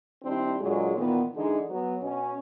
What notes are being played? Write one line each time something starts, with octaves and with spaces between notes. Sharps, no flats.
D#3 G3 C4 D4 E4
A#2 D3 F#3 G#3
A#2 D#3 E3 B3
D3 E3 G#3 D#4
F#3 B3
B2 C#4